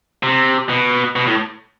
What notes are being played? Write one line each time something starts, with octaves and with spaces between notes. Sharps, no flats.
C3
B2
B2
A2